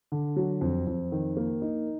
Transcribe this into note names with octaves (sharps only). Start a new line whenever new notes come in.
D3
F#3
F2
F2
D#3
A#3
D#4